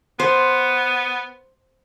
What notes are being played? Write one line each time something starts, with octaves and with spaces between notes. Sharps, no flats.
B3 C5